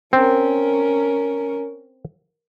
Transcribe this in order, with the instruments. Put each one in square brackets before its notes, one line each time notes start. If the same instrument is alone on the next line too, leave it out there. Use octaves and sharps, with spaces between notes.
[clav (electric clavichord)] C4 [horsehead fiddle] C#4 A#4